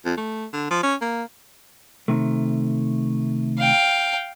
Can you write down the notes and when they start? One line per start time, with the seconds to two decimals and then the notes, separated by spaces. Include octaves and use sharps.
0.05 F2
0.17 A3
0.53 D3
0.70 F3
0.83 C#4
1.01 A#3
2.08 C3 D#3 A3
3.58 F5 G5